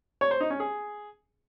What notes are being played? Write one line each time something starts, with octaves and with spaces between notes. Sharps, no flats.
C#5
C5
D#4
C#4
G#4